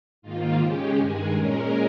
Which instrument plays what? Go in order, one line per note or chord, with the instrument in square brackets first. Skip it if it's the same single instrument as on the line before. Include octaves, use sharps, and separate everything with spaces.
[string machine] G#2 D#3 A#3 F4
C#3 G#3 C#4 G4
G2 D#3 G#3 G#4
A#2 G#3 C#4 A#4